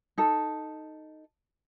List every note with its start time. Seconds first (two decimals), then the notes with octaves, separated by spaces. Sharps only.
0.18 D#4 A4